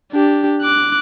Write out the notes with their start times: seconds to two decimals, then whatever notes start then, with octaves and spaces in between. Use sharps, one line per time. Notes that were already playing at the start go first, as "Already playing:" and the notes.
0.12 D4 G4
0.62 D6 F#6